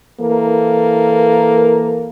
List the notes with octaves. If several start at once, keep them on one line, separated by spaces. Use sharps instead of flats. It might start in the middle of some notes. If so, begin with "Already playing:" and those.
E3 A#3 A4 A#4